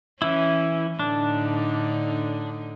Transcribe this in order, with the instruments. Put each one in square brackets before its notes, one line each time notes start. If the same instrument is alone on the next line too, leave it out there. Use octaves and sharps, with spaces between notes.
[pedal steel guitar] E3 E4 [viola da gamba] C#4
[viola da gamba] A2 D3 D#4 [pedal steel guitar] D4